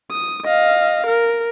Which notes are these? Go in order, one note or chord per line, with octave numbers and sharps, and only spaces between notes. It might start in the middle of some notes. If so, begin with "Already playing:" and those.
D#6
D#5 F5
A#4